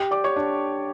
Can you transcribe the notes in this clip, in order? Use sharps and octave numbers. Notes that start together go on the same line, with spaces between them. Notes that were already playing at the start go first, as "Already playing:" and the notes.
Already playing: G4 G5
D5 D6
C#5 C#6
D4 D5